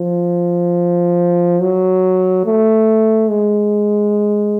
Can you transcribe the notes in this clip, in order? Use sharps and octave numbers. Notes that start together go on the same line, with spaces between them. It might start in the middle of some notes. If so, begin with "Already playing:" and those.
Already playing: F3
F#3
A3
G#3